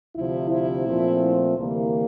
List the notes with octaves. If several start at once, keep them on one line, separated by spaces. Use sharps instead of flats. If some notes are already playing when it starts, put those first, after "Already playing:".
D2 C3 F3 E4
E4
A#2 F3 A3 C4
D2 C3 E3 G3 A#3